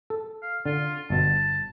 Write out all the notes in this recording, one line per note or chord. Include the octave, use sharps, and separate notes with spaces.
A4
F5
D3 F4
G1 B2 A5